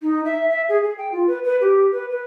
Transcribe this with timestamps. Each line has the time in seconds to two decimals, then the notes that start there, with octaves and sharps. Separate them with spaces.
0.02 D#4
0.25 E5
0.50 E5
0.69 G#4
0.83 G#4
0.98 G5
1.12 F4
1.27 B4
1.44 B4
1.61 G4
1.92 B4
2.10 B4